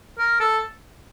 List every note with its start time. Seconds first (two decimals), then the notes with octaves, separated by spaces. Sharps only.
0.18 A#4
0.40 A4